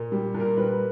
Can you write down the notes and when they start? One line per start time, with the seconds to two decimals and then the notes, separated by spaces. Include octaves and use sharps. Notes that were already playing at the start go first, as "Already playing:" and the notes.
Already playing: A#2
0.12 G3
0.34 A#2
0.40 A#4
0.57 G3 B4